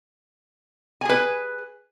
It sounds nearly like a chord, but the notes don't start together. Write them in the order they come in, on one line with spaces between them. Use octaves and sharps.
G#5 G#4 B4